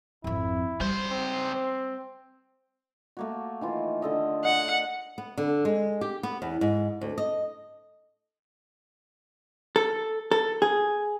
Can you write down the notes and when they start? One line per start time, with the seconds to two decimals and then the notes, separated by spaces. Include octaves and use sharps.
0.24 G#1 F2 E4
0.80 C#2 G3 C5
1.10 C4
3.17 A3 A#3 F#4
3.61 D#3 E3 F4
4.02 D3 A4 D#5
4.45 D#5 F#5
5.18 B3
5.38 D3
5.65 G#3
6.01 G4
6.23 B3
6.42 E2
6.61 G#2
7.01 D2
7.18 D#5
9.76 A4
10.31 A4
10.62 G#4